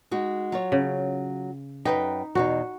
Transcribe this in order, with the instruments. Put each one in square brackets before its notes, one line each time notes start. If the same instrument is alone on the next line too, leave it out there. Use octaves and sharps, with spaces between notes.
[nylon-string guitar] G#3 D#4 F#4
F#3 F4 C#5
[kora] C#3
[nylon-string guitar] F#2 B4 G5 [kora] D#4
[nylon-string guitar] E2 B2 D#4 [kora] F#4